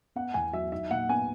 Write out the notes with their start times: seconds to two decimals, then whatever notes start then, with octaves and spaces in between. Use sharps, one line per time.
0.16 B3 F#5
0.34 E2 G#5
0.53 F#3 E5
0.72 D#4 E5
0.91 A#2 F#5
1.09 B3 G#5